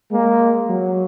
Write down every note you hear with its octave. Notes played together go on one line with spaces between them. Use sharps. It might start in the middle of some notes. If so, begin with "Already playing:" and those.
G#3 A#3
F#3